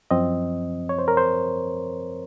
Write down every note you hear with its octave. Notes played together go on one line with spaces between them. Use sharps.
F#2 F3 C4 D#5
C#5
C5
A#4
C5